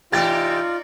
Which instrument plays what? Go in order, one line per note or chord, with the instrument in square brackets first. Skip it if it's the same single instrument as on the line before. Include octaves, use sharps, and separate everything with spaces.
[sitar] C3 E3 G4 [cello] D#4 D5 [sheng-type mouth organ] F4 [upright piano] G5 A6